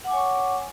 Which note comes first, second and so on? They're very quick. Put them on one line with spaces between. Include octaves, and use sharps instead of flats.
F#5 D6 G#5 C#5 C#6